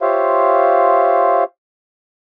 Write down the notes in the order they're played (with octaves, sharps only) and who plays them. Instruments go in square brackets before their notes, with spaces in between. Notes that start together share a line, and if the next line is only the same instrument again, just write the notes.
[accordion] F4 G4 C5 C#5 E5 F5